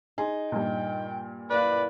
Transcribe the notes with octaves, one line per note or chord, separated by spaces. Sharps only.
D#4 G#4 C6
G2 A#2 G5
F#2 E3 A#3 B4 D5